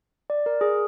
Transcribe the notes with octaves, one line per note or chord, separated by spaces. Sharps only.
D5
A#4
G#4